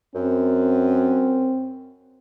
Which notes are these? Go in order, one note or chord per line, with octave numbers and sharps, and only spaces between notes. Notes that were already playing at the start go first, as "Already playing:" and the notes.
F#2 C4